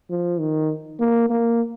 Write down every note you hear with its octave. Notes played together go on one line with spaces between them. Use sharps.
F3
D#3
A#3
A#3